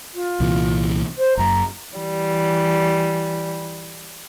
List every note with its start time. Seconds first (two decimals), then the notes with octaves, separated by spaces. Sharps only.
0.14 F4
0.40 C2 A#2 E3
1.18 C5
1.37 F#1 F#2 A#5
1.95 E3 G3